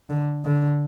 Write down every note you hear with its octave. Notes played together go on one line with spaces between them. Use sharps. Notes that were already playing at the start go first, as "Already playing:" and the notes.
D3
D3